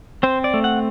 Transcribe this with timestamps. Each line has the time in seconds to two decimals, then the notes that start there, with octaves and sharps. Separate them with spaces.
0.23 C4 C5
0.44 D5
0.54 A3
0.64 F#5